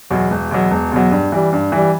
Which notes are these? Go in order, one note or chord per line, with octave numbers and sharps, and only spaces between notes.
E2 B2 F#3
E1
E2 B2 F#3
E1
E2 B2 F#3
G2
E3 G3
G2
E3 G3